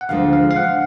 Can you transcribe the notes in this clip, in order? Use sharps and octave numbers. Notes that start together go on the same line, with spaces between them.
F#5
D2 D3 F3 G#3 F5
F5
F5
F#5